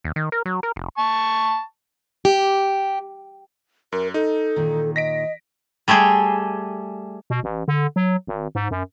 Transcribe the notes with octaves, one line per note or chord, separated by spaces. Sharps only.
D#2
D#3
A#4
F#3
A#4
F1
A5 C#6
G4
F#2 A#4
D#4 A4
A#2 D#3
D#5 A#6 B6 D7
G3 A3 G4 G#4
B2
A1
D3
F#3
G#1
G#2
F#2